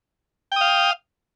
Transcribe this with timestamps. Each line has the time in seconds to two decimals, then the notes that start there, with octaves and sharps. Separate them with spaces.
0.52 G5
0.56 D#6
0.61 F5